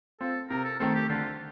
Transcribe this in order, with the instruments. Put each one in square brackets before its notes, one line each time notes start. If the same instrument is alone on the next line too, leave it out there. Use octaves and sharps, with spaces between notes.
[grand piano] C4 F4 [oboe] A4
[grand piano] C3 [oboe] A#4
[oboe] A4
[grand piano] D#3 A3 C4 [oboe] A4
[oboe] G4
[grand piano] D3 [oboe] F4